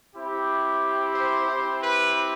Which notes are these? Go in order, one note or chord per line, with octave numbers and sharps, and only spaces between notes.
C4 E4 G4
C5
C4 E4 G4
B4